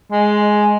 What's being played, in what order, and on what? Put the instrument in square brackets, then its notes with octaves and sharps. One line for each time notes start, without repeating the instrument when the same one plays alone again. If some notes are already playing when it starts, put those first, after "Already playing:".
[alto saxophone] G#3